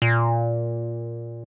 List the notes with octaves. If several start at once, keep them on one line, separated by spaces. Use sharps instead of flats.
A#2